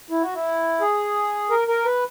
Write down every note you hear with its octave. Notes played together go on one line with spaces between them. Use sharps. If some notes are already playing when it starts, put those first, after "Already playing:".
E4
F#4
E4
G#4
A#4
A#4
B4